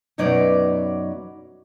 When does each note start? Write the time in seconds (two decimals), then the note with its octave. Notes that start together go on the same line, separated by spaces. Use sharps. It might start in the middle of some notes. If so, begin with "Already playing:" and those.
0.18 F#2 B2 F#3 D#4 B4 D5